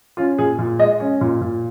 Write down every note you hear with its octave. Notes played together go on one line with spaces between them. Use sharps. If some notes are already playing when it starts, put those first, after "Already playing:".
C#4 F4
A#2 G#4
A#2
G#3 D#5
C#4
A#2
A#2